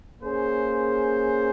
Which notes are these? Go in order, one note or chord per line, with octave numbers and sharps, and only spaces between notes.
A#3 C#4 G#4 C5